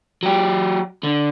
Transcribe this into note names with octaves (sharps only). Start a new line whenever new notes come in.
F#3 G4
D3